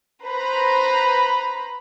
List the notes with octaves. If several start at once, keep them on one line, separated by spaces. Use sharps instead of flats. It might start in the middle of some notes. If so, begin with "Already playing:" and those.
B4 C5 A#5 B5